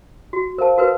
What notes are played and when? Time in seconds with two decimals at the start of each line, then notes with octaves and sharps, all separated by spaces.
0.33 F#4
0.58 A#4 C5 F5 A5
0.78 F#4 A#4 B4